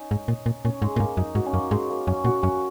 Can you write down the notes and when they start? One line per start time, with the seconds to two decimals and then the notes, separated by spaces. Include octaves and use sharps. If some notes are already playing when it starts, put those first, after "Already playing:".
Already playing: C#4 D#4
0.11 G#2
0.28 A#2
0.46 A#2
0.65 A#2 C#4
0.82 G#2 G#3
0.96 A#2
1.00 G#2 A#3
1.17 F#2 D#4
1.35 G#2 F#4
1.46 C#4
1.53 F#2 A#3
1.71 G#2 G#3
1.90 A#3
2.07 F#2 C#4
2.24 A#2 F#4
2.42 F#2 C#4